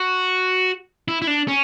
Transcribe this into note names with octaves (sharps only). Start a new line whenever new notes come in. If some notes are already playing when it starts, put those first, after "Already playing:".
Already playing: F#4
E4
E4
D4
C#4